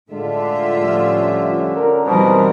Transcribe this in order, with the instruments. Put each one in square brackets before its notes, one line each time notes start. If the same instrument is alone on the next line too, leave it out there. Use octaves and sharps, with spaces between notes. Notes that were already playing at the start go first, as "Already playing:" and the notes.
[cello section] A2 F4 E5 [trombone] D3 [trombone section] G#3
[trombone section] F3 G3 C#4
C#4 A#4
[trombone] B2 [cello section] E3 G3 A#4 [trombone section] C4 D#4 C5